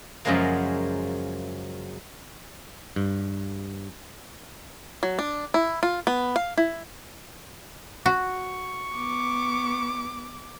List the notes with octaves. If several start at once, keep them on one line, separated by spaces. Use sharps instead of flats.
F#2 C#3 F3 F#3 G#3 A#3
G2
F#3
D4
E4
F4
B3
F5
E4
F#4 C#6
B3 D6